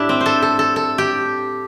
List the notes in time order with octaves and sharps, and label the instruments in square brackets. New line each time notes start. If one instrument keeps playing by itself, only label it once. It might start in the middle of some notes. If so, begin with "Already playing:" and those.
Already playing: [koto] A2 G3 D4 E4 G4
C4
C5
A4
A4
A4
A4
G4